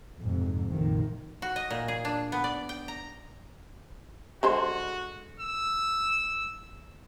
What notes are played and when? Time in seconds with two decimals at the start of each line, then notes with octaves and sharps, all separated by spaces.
0.19 F2 G#2 C3
0.69 A#1 F2 G#2 C3 D#3
1.42 F#4
1.56 D#5
1.71 A#2
1.88 G#4
2.05 D4
2.32 B3
2.44 D5
2.69 G5
2.88 A#5
4.43 D3 G#3 F#4 C5
5.40 E6